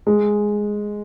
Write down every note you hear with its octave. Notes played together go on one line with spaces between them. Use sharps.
G#3